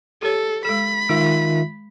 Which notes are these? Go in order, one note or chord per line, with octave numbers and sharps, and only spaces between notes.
G4 A4 C#5
G#3 A4 B5
D#3 G#3 F4 E5